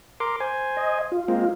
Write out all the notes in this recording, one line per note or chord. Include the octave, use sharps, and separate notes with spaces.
A#4 C6 D6
C5 G#5
D#5
F4
G#3 A#3 C4